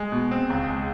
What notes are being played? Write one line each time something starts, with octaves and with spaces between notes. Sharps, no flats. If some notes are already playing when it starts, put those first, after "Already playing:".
Already playing: G#3
B2
C4
C#2
G#3